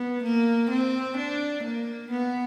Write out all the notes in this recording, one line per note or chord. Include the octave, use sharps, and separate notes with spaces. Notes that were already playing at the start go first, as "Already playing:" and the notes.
Already playing: B3
A#3
C4
D4
A#3
B3